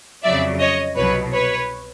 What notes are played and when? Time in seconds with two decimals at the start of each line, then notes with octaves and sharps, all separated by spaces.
0.24 F2 C#3 F#3 D5 E5
0.60 C#5 D#5
0.96 C2 B2 F#3 B4 C#5
1.33 B4 C#5